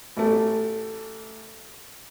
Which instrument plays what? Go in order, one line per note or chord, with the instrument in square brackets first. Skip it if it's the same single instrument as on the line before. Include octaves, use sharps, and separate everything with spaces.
[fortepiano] A1 A3